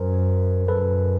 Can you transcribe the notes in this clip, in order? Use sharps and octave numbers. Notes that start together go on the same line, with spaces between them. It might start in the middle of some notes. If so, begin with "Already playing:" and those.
Already playing: F#2 A#4 C5
F#2 A4 B4